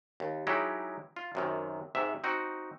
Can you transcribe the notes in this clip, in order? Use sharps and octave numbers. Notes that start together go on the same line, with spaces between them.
D#2
F#3 G#3 D#4 E4 G4
F4
F#2 C3 D#3
G#2 C3 E5
C4 D#4 F#4